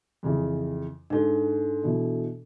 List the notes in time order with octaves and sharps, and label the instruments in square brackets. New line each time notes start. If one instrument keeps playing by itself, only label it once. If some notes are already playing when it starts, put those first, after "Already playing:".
[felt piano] F2 C#3 E3
[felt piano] G#2 [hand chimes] D4 A4
[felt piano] B2 E3